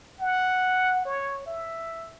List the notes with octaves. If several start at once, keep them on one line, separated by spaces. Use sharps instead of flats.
F#5
C#5
E5